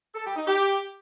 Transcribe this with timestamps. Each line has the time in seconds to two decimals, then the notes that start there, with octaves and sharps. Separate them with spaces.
0.15 A4
0.25 G4
0.36 D#4
0.47 G4